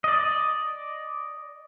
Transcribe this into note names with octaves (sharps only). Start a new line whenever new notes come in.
D5 D#5